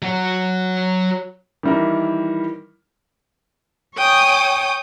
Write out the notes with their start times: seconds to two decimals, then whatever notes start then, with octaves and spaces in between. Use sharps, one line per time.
0.02 F#3 F#4
1.63 D#3 E3 G3 E4 A#4
3.97 C#5 G5 G#5 D#6